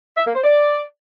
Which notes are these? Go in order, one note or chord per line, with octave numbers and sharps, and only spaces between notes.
E5
A#3
C5
D5